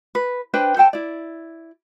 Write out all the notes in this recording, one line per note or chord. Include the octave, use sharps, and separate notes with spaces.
B4
D4 B4 C5 G5
A4 C5 G5 A5
E4 D5